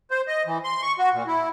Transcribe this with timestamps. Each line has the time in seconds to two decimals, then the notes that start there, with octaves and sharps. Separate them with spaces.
0.11 C5
0.28 D#5
0.46 E3
0.64 C6
0.82 C#6
0.99 F#4
1.14 A#2
1.27 E4